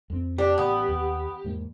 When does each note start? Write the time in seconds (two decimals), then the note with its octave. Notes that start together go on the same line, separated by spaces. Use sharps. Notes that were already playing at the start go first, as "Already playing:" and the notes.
0.10 F2 C4
0.38 D4 G4
0.58 A1 B3
0.88 D#2
1.44 E2 G#2 A#3